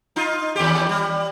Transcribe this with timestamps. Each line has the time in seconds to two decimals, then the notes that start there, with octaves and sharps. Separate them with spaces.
0.16 D#4 F4
0.56 D#2 G4
0.89 G3